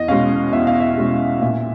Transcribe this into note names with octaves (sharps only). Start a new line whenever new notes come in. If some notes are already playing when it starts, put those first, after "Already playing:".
Already playing: E2 D#5
B2 G#3 C#4 F5
E2 E5
F5
E5
B2 G#3 C#4
A#2 E5